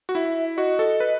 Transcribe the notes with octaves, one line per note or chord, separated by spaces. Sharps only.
F#4
E4 E5
F#4 D#5
A4
B4